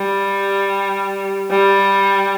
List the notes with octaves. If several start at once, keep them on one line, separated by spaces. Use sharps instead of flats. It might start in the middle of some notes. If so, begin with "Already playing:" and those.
Already playing: G3
G3